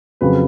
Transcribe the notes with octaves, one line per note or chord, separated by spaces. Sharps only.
F2 C#3 F#3 B4